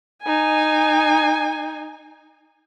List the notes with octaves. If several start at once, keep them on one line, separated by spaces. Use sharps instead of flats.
D#4 G#5